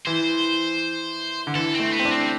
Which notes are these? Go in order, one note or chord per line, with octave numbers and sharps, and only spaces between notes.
E3 C5
D3
E3 A4
C4
A3
B3
C4
D4
C4